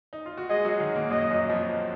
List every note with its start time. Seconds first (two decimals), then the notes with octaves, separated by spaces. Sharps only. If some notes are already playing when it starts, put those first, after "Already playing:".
0.13 D#4
0.26 F4
0.37 F#4
0.49 G#3 G#4 D#5
0.65 F#3 F#4
0.80 D#3 D#4
0.95 A#2 A#3
1.10 F#2 F#3 D#5
1.30 F#2 F#3
1.50 F2 F3